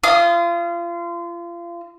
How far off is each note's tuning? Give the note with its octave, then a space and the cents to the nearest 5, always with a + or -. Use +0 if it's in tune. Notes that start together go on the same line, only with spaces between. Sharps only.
F4 -30 D#6 +0